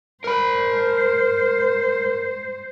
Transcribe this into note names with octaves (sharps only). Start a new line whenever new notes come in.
A#4 C5 B5